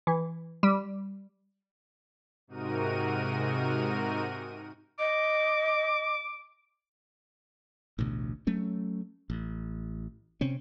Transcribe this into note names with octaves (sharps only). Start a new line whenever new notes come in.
E3
G3
G#2 C3 D#4 F#4 A#4 D#7
D#5 D6
A1 D2 B2
F#3 A3 C#4
A1
C3 C4 C#4